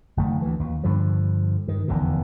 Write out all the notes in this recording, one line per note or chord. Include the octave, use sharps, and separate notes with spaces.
F#1 D#3 A3
D2 E3
D#2
G2 D3 F3
G2 D#3
F1 E2 D3 D#3